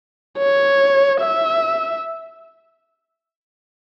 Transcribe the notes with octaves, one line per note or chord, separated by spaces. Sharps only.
C#5
E5